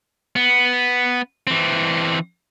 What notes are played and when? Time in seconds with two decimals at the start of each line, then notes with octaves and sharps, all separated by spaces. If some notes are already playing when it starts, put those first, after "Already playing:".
0.36 B3
1.47 E3 C4